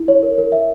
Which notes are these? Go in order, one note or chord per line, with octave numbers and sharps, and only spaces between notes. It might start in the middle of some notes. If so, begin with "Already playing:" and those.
Already playing: E4
C#5
A#4
A#4
E5